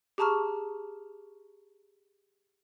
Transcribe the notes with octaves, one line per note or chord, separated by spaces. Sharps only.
G4 G#4 A5 A#5 C#6 F6